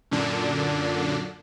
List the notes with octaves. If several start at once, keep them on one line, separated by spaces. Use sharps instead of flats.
F#2 A#2 D3 D4